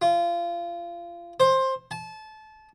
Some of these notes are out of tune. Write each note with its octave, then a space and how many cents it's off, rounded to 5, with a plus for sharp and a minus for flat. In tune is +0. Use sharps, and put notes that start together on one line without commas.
F4 -25
C5 +15
A5 -25